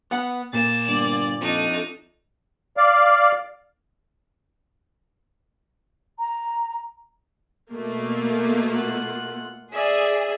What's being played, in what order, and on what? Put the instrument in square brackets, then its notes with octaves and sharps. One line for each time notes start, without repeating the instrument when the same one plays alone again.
[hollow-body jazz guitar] B3 F#5
[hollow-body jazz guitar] A#2 [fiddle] A#3 [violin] A6 E7
[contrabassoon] G1 [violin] D5
[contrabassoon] F2 [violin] A3 D4 [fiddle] D#4
[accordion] D5 F5
[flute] A#5
[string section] B2 A3 A#3
[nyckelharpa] F4 F#5
[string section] G#4 [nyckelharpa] D5 E5